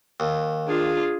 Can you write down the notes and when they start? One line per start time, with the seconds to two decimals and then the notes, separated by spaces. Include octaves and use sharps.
0.20 D#2
0.68 D4 F4 G#4